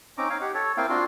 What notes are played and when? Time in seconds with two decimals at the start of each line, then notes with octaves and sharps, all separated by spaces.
0.18 C4 C#4 D#4 A#5 D6
0.30 D#4 C#5 F5
0.41 G4 F#5
0.54 A4 C#5
0.77 A#3 C4 E4 F5 G5
0.90 C4 D4 F4 F#4 C6